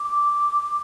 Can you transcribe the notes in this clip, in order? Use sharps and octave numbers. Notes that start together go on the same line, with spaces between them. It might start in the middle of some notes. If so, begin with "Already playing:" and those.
Already playing: D6